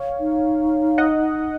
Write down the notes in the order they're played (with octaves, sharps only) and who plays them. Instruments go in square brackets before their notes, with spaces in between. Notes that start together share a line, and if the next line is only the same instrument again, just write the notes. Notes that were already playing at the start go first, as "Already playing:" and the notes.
Already playing: [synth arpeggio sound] C#5 F5
[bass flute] D#4
[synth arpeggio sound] D#5 F#5